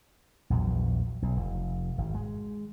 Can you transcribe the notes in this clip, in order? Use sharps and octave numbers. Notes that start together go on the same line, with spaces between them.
A#1 E2 C#3 F#3
B1
F1
G#1
G#3